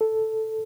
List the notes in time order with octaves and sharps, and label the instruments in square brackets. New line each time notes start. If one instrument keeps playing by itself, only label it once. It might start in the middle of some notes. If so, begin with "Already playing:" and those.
[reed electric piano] A4